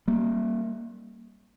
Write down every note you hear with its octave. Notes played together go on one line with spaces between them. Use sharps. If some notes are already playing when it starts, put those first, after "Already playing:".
G3 A#3